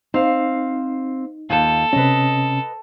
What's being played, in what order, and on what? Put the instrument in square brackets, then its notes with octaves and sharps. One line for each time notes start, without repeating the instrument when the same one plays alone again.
[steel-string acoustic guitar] C4 F5 [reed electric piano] D#4
[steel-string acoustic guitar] D#2 F4 [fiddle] A4
[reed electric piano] C3 C#4 [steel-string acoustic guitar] B4 D#5